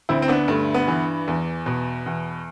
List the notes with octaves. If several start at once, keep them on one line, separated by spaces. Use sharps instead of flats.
D2 C4 E4
C4
B3 D4
G2 A3
B3
E3
E2
B2
E2